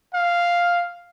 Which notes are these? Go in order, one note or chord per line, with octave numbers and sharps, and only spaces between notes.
F5